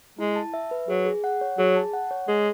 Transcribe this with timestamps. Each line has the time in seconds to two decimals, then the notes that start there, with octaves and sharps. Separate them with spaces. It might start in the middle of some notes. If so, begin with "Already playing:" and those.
0.18 G#3 E4
0.36 A5
0.54 E5
0.71 B4
0.88 F#3 G#4
1.06 G#4
1.24 F#5
1.41 C#5
1.58 F#3 G#4
1.76 A5
1.93 F#5
2.11 C#5
2.28 G#3 G#4